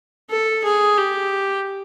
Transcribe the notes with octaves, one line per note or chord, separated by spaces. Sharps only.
A4
G#4
G4